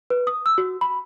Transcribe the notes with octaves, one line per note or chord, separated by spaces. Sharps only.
B4
D#6
E6
F#4
B5